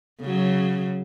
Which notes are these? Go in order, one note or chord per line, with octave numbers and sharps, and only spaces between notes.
C#3 F#3